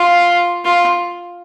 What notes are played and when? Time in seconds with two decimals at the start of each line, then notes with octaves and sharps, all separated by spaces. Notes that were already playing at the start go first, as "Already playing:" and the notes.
Already playing: F4
0.65 F4